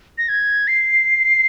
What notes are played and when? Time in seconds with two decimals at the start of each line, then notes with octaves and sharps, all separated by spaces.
0.18 A#6
0.28 G#6
0.67 C7